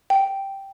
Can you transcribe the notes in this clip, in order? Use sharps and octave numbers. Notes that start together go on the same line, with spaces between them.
G5